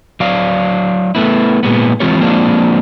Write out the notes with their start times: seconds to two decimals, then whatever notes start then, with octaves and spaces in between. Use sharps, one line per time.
0.20 F#3 D5 F5
1.15 A3 B3 E4
1.63 A#2 G#3 B3
2.00 E3 G#3 C4 F4 G4 C#5
2.20 F3 G#3 A#3 C4 D4